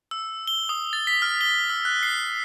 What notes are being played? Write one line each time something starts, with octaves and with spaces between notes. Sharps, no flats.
E6
G7
D#6
A6
B6
F6
G7
E6
F#6
C7